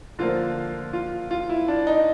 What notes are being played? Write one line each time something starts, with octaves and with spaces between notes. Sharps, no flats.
D3 F3 A#3 F4
F4
F4
E4
D4
D#4